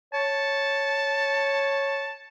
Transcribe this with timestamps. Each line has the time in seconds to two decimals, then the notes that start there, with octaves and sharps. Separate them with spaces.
0.13 C#5 A5